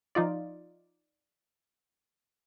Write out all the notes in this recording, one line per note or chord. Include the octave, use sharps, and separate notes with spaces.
F3 D#4 F4 D5